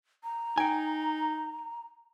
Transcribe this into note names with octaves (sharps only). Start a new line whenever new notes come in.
A#5
D#4 G5 G#5